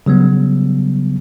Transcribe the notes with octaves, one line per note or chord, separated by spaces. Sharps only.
C#3 F#3 G3 B3